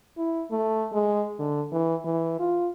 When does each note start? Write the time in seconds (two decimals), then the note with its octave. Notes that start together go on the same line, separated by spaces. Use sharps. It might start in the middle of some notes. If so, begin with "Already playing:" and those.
0.17 E4
0.51 A3
0.93 G#3
1.39 D3
1.72 E3
2.05 E3
2.40 F4